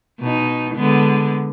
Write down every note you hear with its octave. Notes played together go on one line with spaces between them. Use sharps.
B2 D#4
D3 G#3 B3